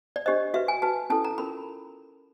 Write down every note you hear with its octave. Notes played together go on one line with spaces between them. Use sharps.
D5
D4 G4 C5 D#5
F#4 B4 E5
G#5
F#4 B4 A5
C#4 E4 A4 A5
A#5
C#4 F4 A#4 B5